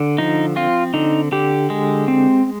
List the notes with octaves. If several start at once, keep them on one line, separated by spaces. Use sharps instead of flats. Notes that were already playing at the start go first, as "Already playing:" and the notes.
Already playing: D3
F3 D#4
C4 F4
D3 D#4
D3 G4
G#3
C4